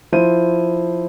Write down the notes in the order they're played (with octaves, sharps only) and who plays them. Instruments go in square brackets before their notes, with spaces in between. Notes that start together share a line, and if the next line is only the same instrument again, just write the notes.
[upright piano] F3 E4 C5 D#7